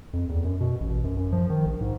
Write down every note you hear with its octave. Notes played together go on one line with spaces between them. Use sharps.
F2
E2
F#2
B2
A1
F#2
F#2
F3
D#3
A#1
G#2